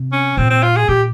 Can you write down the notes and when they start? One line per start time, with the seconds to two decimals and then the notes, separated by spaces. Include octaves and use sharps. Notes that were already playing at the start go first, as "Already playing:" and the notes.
Already playing: C3
0.12 C#4
0.37 A#2 C4
0.50 C4
0.63 F4
0.76 G#4
0.88 A#2 G4